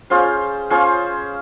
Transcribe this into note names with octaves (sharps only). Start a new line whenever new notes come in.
C#4 F4 G#4 C5
C#4 F4 G#4 C5